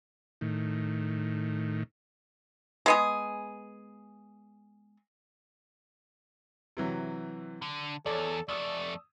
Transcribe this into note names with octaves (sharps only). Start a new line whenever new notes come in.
A2 D#3
G#3 B3 G#4
C3 E3 F#3
D3
E2 A4 C#5 D5
F2 A3 D5 D#6 E6